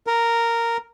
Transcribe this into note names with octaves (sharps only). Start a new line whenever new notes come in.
A#4